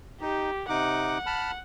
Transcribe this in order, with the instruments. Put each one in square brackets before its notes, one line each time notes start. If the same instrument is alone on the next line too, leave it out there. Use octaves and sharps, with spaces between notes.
[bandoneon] D#4 [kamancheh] G4
[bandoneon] C3 D#4 D6 [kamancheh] F#5
[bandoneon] A5 B5 F6